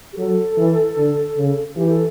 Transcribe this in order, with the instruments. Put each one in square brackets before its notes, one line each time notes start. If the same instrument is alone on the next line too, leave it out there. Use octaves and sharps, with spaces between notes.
[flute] G4
[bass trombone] F#3 [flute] A4
[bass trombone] E3
D3
C#3
[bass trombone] E3 [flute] G4
[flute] A4